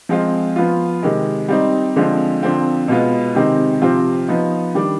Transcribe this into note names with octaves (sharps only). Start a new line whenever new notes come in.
F3 G#3 C4 F4
F3 B3 F4
C3 D#3 G#3
G3 C4 D#4
D3 F3 G#3 C4
D3 F3 C4
B2 G#3 B3 F4
C3 D#3 G#3 C4 D#4
C3 F3 C4 F4
F3 B3 D#4
D#3 G3 D4